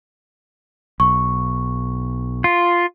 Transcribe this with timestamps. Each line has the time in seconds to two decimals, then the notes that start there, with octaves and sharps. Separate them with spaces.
1.00 B1 C#6
2.44 F4